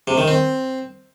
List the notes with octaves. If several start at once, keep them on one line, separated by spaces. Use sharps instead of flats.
C3
D#3
C4